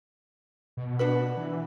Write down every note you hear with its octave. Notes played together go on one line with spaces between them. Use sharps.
B2
D4 F#4 B4
E3